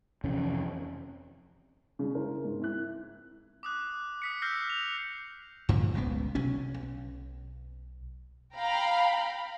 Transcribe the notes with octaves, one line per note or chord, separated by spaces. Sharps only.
F2 C3 E3 C#4
C#3 G#3 D4
D4 E4 A#4 C5
G#2
C4 E4 F#6
D6 D#6 F#6
D#6 B6 C#7
E6 F6 G6 A#6 C7
F7
G2 A#2 D3 F3
F#1 C#2 A#2 B3
B1 C3 C#4
B1
F5 G5 A#5 B5